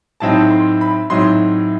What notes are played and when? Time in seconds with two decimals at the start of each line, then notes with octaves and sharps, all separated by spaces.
0.20 A2 F#3 C4 D#4 A5
0.51 C6
0.81 B5
1.10 A2 F#3 C4 D#4 C6